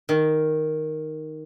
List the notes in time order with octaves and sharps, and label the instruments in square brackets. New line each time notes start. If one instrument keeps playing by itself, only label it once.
[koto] D#3